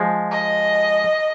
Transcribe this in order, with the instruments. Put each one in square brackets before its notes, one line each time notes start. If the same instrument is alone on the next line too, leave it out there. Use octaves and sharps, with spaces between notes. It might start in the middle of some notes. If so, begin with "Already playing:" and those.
Already playing: [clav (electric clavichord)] F3 G#3
[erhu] D#5